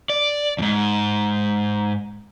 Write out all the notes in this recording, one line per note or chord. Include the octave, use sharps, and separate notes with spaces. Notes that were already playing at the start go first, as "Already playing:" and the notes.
D5
F2 G#2